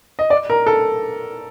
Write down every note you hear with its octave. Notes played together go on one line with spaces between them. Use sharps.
D#5
D5
A#4
A4